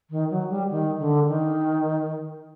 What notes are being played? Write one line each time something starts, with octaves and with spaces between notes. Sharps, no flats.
D#3
F#3
G3
D#3
D3
D#3